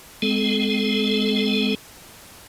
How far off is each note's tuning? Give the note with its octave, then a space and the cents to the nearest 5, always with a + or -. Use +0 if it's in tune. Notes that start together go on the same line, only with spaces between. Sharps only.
G#3 +0 C4 -35 A4 -30